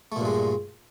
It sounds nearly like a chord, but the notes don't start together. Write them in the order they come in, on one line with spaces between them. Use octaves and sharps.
A3 A#2 G2 G#3